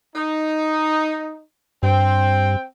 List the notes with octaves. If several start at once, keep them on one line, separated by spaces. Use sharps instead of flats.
D#4
G2 C4 G5